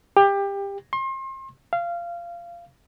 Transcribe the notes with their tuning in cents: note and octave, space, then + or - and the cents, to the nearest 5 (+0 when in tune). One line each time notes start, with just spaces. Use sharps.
G4 +20
C6 +35
F5 -20